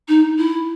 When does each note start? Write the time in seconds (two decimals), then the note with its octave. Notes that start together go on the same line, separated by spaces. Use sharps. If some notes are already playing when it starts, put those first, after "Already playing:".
0.08 D#4
0.38 E4